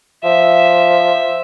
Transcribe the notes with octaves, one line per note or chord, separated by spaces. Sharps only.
F3 E5